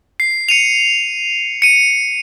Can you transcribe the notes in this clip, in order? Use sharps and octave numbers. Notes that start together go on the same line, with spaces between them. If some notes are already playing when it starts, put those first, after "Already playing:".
C7
C#7 D#7 F7
C#7 D#7